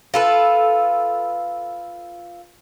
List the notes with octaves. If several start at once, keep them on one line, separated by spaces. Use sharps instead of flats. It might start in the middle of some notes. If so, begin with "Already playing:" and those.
F4 A4 B4